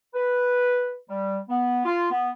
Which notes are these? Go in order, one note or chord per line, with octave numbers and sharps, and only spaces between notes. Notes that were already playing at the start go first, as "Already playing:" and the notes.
B4
G3
B3
F4
B3